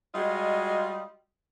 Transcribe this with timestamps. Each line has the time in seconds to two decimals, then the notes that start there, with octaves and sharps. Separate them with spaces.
0.14 G3 G#3 F4 F#4 D#5